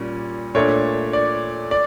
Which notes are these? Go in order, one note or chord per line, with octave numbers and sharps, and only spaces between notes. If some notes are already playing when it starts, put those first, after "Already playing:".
Already playing: A#2 G3 C#4
A#2 A3 D4 C#5
D5
D5